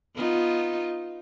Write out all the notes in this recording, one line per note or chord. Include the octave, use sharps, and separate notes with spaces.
B3 D#4 F4